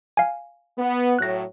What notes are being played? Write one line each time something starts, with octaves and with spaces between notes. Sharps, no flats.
F5 G#5
B3
A2 F#3 F#6 A#6